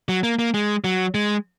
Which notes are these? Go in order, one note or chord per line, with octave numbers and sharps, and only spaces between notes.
F#3
A#3
A#3
G#3
F#3
G#3